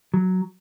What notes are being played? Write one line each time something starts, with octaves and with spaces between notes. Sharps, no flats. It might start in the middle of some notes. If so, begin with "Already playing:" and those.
F#3